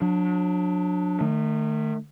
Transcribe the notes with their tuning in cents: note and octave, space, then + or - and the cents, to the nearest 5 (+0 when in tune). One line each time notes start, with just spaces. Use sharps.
F#3 -40 D4 +0
D#3 -35 A3 +0